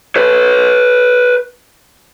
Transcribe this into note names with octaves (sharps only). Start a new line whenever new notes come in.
B4 C#5